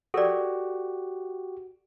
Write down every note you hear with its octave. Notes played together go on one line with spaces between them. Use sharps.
F#4 G4 A4 A#4 D5